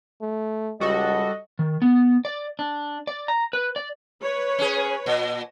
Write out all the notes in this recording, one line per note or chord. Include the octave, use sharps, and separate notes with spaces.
A3
C#2 G3 F#4 A4 D#5
D#3
B3
D5
D4
D5
A#5
B4
D5
B4 C#5
C#4 G#4
A#2